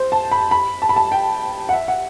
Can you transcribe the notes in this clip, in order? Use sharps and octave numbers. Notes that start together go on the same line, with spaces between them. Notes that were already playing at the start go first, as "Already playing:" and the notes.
Already playing: C5
A5
B5
B5
A5
B5
A5
G5
F#5
E5
F#5